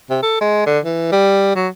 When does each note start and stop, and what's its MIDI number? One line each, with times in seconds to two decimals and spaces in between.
0.10 0.18 48
0.23 0.40 69
0.41 0.63 56
0.66 0.79 50
0.85 1.08 52
1.12 1.52 55
1.56 1.68 54